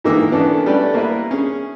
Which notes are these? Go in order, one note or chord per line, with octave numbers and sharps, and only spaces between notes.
G#2 D#3 E3 A#3 D6 E6
E3 B3 C#4 D4 A4
G3 A3 C#4 B4 D5
A#3 B3 E4 B4
C#4 G#4